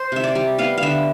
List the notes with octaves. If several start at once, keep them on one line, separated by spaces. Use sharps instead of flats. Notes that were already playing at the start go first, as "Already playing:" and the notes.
Already playing: C5
C3 E5
D5
G3
B3 F5
F5
D3 E5